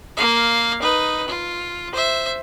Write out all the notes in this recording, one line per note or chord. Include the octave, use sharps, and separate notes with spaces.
A#3 F5
D#4 B4
F4
C5 E5